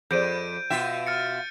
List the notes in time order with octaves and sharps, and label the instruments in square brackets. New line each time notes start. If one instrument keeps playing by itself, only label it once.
[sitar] F2 [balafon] G#4 C5 D5 [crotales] G6 D7 D#7
[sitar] B2 F4 E5 [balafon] G5
[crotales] F6 A6 C#7